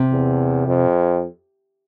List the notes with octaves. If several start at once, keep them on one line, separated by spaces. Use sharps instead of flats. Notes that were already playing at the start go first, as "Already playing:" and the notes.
Already playing: C3
E2
F2